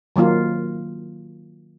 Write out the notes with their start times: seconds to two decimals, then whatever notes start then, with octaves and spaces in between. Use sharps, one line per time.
0.16 D#3 F#3 A#3 F4